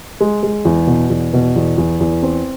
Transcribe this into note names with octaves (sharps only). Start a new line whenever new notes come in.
G#3
G#3
E2
B2
E2
B2
E2
E2
E2
C4